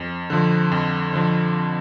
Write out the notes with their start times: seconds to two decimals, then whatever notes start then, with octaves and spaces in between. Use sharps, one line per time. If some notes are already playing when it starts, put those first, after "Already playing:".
Already playing: F2
0.30 D3 F3
0.72 F2
1.13 D3 F3